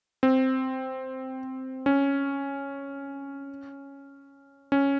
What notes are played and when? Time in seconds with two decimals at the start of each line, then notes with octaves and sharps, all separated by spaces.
0.23 C4
1.86 C#4
4.72 C#4